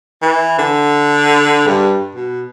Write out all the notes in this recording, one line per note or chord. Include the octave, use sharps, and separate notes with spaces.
E3
D3
G2
B2